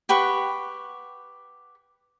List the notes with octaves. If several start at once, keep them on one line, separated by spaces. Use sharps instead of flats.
G4 B4 F#5 C#6